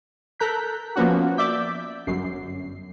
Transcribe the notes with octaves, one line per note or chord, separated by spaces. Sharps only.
A4 A#4 A#5 F#6 G6 B6
F3 A#3 B3 C#4 F#4
D5 E5 D6 G6 B6
G1 F#2 C7